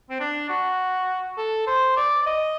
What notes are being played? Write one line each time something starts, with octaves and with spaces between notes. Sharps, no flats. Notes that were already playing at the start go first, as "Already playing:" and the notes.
C4
D4
F#4
A4
C5
D5
D5
D#5